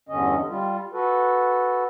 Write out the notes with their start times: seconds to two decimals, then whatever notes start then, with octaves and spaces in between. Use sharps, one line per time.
0.09 E2 G2 D3 C#4 D#5
0.50 G3 F4
0.93 F#4 A4 B4